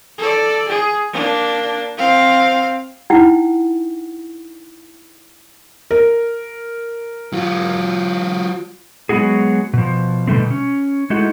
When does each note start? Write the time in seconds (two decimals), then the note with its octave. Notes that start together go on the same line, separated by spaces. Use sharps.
0.19 A4 D5
0.69 G#4
1.13 A#3 D4
1.98 C4 F5
3.10 D#4 E4 F#5 G5
5.91 A#4
7.33 F#3 F4
9.09 F#3 G#3 B3 E4 F#4 G#4
9.73 B2 F3
10.27 B2 D3 G3 A3 C4
10.51 C#4
11.10 G#3 A3 D#4 E4 F#4